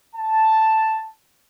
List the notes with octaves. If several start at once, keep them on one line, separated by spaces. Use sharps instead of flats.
A5